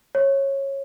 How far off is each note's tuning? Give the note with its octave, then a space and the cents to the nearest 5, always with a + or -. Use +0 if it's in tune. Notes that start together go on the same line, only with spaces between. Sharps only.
C#5 -15